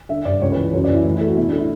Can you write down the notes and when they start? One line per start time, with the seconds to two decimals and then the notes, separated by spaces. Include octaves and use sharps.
0.09 D3 E5
0.25 G2 D5
0.41 C#2 C#5
0.52 B4
0.57 E3
0.73 F#2 C#5
0.84 D5
0.89 E3
0.95 E4
1.05 A2 E4
1.16 E4
1.21 A3
1.27 F#4
1.37 B2 E4
1.48 D4
1.53 A3
1.58 E4